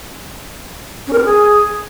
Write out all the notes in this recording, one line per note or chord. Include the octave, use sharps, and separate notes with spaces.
C#4
A#4
C4
G#4